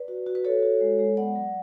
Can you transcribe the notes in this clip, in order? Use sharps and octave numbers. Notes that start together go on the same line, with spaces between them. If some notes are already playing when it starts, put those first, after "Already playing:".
Already playing: B4 D5
F#4
F#4
B4
F#4 A4 C#5
F#4
G#3
G#3
B3 D5 F#5
F#3